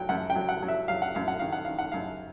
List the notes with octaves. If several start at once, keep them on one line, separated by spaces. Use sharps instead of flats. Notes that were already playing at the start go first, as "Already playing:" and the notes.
Already playing: F#3 G5
F#2 F#5
G5
F#3
F#5
F#3
E5
F#3 F5
F#5
F#2 F5
F#5
D#3 F5
F#5
D#3 F5
F#5
F#2 F5